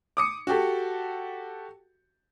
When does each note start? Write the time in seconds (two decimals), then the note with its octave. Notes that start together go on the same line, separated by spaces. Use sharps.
0.17 D6 D#6 C#7
0.47 F#4 G4 A4